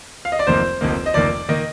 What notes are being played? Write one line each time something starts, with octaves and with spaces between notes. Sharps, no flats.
F5
D#5
D5
F1 F2 D#3 A#3 C5
F1 F2 D#3 A#3
D#5
F1 F2 D#3 A#3 D5
D#3 A#3 D#5